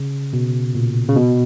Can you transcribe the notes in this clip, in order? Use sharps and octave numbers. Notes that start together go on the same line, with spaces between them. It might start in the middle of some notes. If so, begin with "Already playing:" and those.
Already playing: C#3
B2
A#2
C#3
B2